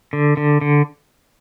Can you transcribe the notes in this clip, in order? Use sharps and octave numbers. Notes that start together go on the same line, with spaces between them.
D3
D3
D3